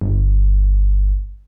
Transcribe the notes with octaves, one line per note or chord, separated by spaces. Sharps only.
G1